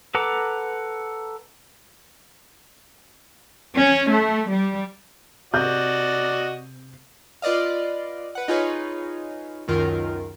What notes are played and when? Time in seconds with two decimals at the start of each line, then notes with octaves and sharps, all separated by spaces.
0.15 A4 B4 F#5 A#5 D6
3.76 C#4
4.10 A3
4.49 G3
5.54 C3 F#4 D5 D#5 G6
7.42 F4 B4 D5 D#5 F5
8.35 B4 F#5
8.48 D#4 F4 G#4 B4 C#5
9.68 C#2 F#2 D#3 F4 A#4